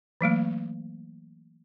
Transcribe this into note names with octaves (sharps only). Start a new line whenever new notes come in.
E3 F#3 A3 A#3